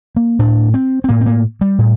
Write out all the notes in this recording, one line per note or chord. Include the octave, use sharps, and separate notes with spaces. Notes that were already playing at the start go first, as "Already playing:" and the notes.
A#3
A2 D4
C4
C4
A2 A#3
C4
A#3
G3
A2